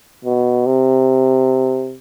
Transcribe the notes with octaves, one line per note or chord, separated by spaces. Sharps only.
B2
C3